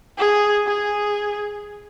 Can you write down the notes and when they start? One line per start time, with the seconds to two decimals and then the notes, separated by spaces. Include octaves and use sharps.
0.18 G#4
0.67 G#4